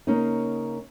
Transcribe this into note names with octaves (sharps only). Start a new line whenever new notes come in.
C#3 A#3 C#4 D#4